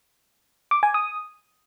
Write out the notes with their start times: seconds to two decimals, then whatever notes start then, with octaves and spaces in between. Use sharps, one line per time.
0.71 D6
0.83 G#5
0.94 D#6